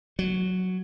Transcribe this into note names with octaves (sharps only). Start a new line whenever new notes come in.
F#3